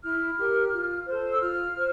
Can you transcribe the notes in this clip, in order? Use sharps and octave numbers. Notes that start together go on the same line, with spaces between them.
E4 F6
G4 A#4
F4
A4 C5
E6
F4 F6
C5